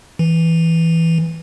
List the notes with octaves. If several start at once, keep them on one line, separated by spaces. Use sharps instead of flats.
E3